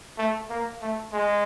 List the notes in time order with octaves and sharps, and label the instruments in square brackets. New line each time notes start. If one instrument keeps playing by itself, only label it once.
[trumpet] A3
A#3
A3
G#3